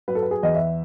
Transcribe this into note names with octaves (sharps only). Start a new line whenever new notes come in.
F#3 B4
A4
B4
G#4
E2 D#5
E5